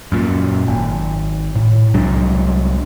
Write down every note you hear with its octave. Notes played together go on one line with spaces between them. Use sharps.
F#2 A#2
G#1
A2
C2 F#3 G#3 D4